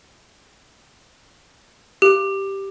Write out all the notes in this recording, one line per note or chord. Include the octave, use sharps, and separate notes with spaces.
G4